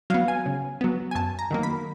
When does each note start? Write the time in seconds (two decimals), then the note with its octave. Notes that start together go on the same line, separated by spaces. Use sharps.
0.10 F#3 B3 F5
0.28 G#5
0.46 C#3
0.81 F#3 B3
1.11 G#5
1.15 F#2 A5
1.39 A#5
1.51 D#3 F#3 A#3
1.63 B5